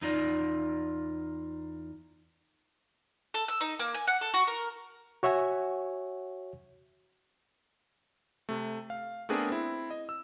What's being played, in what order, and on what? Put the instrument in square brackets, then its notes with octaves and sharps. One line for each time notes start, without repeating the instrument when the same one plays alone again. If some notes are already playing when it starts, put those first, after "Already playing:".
[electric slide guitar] E2 D#4 F4 D5
[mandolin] A4
E6
D#4
A#3
G#5
F#5
A4
F#4
A#4
[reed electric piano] F#4 C#5 E5 F#5 G#5
[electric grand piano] C3 A3
F5
A3 B3 C4 D4 G#4 A#4
C4 E4
D#5
E6